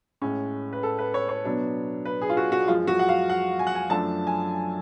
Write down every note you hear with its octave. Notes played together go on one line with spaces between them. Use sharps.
A2 G#3 C#4
B4
A4
B4
C#5
C#5
B2 F#3 B3 D4
B4
G#4
F4
F#4
F#4
F#2 F3 G#3 F4
F#4
F#5
F5
F#5
G#5
F#5
G#5
F#2 F3 A3 D4 A5
G#5